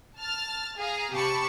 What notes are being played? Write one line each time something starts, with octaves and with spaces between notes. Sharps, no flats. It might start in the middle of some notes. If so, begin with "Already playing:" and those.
A5 F6 A6
G#4 F5 A#5
C3 G4 A5 B5 C#6